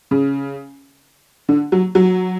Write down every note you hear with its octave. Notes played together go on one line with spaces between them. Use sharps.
C#3
D3
F#3
F#3